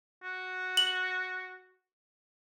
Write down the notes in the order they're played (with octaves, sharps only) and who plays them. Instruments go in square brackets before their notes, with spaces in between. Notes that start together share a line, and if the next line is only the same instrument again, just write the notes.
[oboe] F#4
[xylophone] F#7